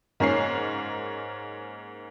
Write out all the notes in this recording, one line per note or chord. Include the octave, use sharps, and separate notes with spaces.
G#2 A#3 C#4 C#5 C7